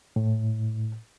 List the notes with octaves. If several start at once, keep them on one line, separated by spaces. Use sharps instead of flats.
A2